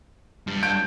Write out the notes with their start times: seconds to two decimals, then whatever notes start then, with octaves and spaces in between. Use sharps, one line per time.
0.47 G2
0.63 G6 D7